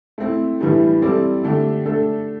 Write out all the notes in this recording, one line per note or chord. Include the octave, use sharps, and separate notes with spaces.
A3 C4 E4
A2 E3 G3 D4
G3 C4 E4 A4 D5
D3 A3 D4 G4
A3 D4 A4